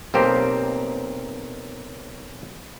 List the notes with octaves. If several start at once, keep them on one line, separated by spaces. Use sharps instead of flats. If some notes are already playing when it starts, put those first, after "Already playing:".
B1 A#3 C4 G4 C5